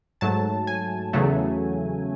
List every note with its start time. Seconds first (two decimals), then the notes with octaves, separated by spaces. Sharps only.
0.21 G#2 F#3 A3 A5
0.67 G#5
1.13 E2 C#3 F#3 A3